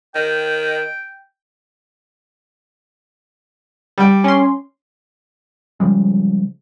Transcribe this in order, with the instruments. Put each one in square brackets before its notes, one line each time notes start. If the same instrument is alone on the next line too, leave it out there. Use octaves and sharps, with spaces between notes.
[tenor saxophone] D#3 [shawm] G5
[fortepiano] G3 G5
[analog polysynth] C#4 C6
[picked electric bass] C#3 F3 G3 G#3